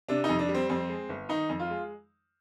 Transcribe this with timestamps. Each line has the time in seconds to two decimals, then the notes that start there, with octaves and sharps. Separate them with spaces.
0.08 C3 D4
0.24 F2 D#4
0.39 D4
0.49 G3
0.54 C4
0.69 F2 C4
0.89 G#3
1.09 G1
1.29 D#3 D#4
1.49 F2
1.60 F4
1.70 G#3